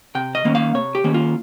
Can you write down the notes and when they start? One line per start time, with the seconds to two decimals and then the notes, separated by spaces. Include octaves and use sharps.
0.15 C3 G5
0.35 D#5
0.45 D#3 A#3 C#4
0.55 F5
0.74 C3 C#5
0.95 G4
1.04 D#3 A#3 C#4
1.14 F4